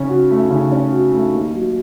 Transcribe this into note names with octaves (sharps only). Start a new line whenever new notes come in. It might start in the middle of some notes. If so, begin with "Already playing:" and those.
Already playing: C#3 C#4
F#4
A3
C#3
C#4
F#4
A3
D#2
F#3